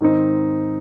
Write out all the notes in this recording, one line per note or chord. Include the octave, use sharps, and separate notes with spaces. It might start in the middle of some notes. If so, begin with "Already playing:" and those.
G#2 D#3 C4 D#4